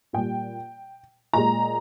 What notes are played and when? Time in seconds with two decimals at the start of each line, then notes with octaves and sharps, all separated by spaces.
0.13 A#2 G3 G5
1.33 A#2 G#3 A#5